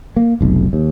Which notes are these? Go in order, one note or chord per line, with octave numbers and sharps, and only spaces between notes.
A#3
F1 B1
D#2